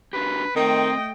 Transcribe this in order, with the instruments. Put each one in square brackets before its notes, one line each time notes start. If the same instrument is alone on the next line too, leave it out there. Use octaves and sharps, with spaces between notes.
[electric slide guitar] D4 F#4 G4 [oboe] B4
[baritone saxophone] D#3 [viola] A3 G5 [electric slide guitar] C4 [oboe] D#5